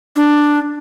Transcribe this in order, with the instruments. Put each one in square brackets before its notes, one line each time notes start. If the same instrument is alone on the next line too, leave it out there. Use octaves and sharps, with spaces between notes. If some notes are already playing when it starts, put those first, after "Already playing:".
[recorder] D4